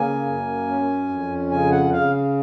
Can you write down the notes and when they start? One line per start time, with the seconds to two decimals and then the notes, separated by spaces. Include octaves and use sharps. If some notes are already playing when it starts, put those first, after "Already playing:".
Already playing: C#3 A#3 G#5
0.26 F#2
0.68 C#4
1.09 F2
1.51 C#3 G#5
1.71 F#5
1.92 C#3 F5